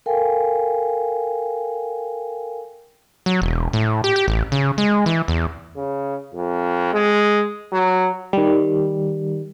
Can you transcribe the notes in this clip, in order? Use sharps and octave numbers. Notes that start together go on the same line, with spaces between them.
A4 A#4 F5 G5 G#5
F#3
E1
A2
G4
G4
A1
C#3
G#3
E3
E2
C#3
F2
G#3
F#3
D#3 G3